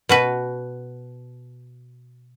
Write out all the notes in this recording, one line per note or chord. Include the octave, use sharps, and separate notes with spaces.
B2 F#4 B4